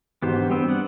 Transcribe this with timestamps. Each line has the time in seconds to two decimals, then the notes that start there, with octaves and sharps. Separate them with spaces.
0.22 G#2 B2 E3 B3 G4 C5
0.37 G2
0.50 G3 B3 C4
0.68 D5 F#5